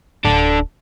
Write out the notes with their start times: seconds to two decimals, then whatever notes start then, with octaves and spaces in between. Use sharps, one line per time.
0.25 D1 D4 A4